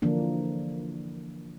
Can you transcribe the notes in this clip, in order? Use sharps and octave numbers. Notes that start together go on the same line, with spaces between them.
D3 E3 F3 A#3 D4